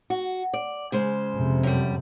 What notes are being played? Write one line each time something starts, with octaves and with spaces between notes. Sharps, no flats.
F#4
D5
C#3 G#3 C5
F2 C3
F#2 G3